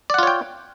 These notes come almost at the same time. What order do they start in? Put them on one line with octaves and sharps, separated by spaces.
D5 F#5 F4 C#5 G5